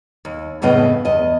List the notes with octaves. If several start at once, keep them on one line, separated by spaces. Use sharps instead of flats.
D#2
F2 A2 C#3 B3 D#5
E2 D#5